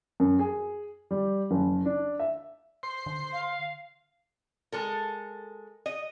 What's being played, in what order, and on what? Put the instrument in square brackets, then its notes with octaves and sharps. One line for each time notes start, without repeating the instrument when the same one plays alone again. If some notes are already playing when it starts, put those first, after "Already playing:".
[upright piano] F#2
G#4
G3
F#1
D4
E5
[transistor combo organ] C5 C6
[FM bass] D3
[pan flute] F5
[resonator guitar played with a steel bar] G#3 A4 A#4
D#5